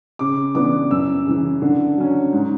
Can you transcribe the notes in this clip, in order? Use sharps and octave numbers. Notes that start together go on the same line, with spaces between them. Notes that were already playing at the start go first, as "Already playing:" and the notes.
C#3 D6
E3 B3 D4 D6
F#2 E6
C#3 E3
D3
F#3 C#4
G#2